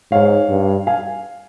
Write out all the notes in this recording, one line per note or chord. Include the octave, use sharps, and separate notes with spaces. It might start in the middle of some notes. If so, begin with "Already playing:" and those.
G#2 C#5 F5
G2
F5 G#5